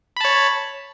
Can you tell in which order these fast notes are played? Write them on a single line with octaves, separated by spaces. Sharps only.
B5 A5 C#5